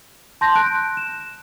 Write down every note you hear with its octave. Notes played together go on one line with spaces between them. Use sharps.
A5 C6 G6 A#6
F#6 D7
E7